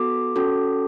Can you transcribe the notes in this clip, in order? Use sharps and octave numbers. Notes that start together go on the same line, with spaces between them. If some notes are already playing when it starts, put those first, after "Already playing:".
Already playing: B3 F#4 A4 D6
C#4 F#4 A4